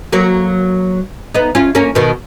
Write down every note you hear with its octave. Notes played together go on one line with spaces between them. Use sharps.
F#3 A#3
B3 D#4
C#4 F4
A#3 C#4
B2 D#3